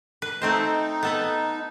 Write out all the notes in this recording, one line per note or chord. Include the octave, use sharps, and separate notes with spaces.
B4
A3 C4 D#4 C5
B3 A4 B4